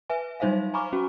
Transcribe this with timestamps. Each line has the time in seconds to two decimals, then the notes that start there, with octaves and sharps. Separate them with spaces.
0.10 B4 E5 G#5
0.40 F#3 G3 D#4 C5 E5 F5
0.74 G#5 A#5 B5 C#6 D6 F6
0.93 C#4 F#4